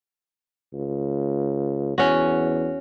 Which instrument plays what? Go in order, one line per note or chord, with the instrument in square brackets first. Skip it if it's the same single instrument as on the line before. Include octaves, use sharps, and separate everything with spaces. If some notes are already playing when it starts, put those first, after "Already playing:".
[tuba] C#2
[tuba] E2 [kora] C#4 F#4